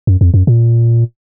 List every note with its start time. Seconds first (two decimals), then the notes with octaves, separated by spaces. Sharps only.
0.07 F#2
0.21 F2
0.34 F#2
0.47 A#2